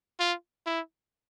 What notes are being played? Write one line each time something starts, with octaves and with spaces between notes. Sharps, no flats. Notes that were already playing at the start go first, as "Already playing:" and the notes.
F4
E4